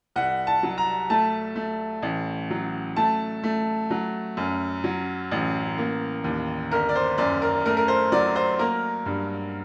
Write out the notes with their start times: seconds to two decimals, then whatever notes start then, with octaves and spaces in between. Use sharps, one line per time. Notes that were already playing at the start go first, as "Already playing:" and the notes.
0.16 C2 F#5
0.47 A5
0.63 F#3
0.78 A#5
1.10 A3 A5
1.56 A3
2.02 A1
2.50 F#3
2.96 A3 A5
3.44 A3
3.90 F#3
4.37 F#2
4.84 F#3
5.31 A1
5.78 A#3
6.24 D#2
6.71 G1 A#4
6.89 D5
6.95 C5
7.18 F#2 D5
7.42 A#4
7.66 A3 A#4
7.77 A#4
7.88 C5
8.12 F#3 D5
8.36 C5
8.59 A#3 A#4
9.06 G2